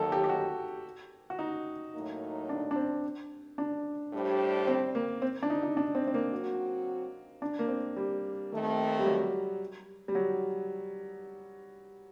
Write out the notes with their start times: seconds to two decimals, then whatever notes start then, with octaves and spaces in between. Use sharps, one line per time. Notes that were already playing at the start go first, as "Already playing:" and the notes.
Already playing: D#2 D#3 F#3 A4
0.12 G4
0.24 G4
0.29 F#4
1.30 F#4
1.39 D#4
1.94 A2 F#3 A#3 D#4
2.49 D4
2.71 D4
2.76 C4
3.58 D4
4.12 A2 G3 D4 G4 C5
4.67 C4
4.95 A#3
5.22 C4
5.43 D4
5.50 D#4
5.63 D#4
5.77 D4
5.95 C4
6.07 C4
6.14 A#3
6.31 F#3 C4 F#4
7.42 D4
7.59 A#3
7.68 C4
7.96 G3
8.51 D#2 D#3 A3 C4
9.00 G3
9.06 F#3
10.08 G3
10.15 F#3